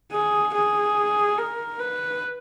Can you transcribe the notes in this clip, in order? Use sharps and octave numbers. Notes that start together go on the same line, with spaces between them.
G#4
G#4
A#4
B4